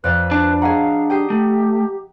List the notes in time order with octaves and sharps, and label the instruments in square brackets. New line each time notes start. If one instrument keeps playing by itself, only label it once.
[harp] F2 D5 F5 [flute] B4 [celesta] F#6
[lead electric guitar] D4 A5
[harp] F#4 G#4 [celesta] D#5 F#5 A#5 [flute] F5
[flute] G4 [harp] G5 D#6 C7
[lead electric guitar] A3